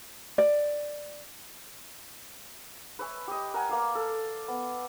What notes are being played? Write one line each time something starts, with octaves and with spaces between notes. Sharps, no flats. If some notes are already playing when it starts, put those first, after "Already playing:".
D5
B4 C#5 E5 G#5
G4 D#5
A#4 F#5 G#5
A#3 D5 F5
A4
B3